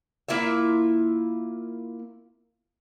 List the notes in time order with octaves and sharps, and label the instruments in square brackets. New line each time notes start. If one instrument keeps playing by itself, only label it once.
[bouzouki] A#3 E4 F4 E5